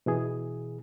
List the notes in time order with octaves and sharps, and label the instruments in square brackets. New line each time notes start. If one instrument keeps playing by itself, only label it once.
[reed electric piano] B2 E3 G#4